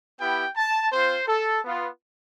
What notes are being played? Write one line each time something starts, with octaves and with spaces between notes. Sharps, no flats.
B3 E4 G4 G5
A5
C4 F4 C5
A4
B3 F4